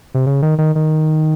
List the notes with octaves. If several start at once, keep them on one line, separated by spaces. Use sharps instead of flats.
C3
C#3
D#3
D#3
D#3